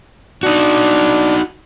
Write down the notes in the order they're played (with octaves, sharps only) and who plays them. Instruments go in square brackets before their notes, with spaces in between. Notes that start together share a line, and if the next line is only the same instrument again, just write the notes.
[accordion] D4 [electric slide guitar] D#4 F#4